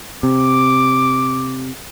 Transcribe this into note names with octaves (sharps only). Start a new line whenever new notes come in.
C3 D6